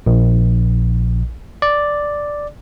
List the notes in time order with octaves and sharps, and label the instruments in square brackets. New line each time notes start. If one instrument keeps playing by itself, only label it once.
[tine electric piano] A#1
D5